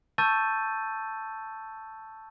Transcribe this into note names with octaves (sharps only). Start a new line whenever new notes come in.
A5 C#6 E6 G6 A6 D#7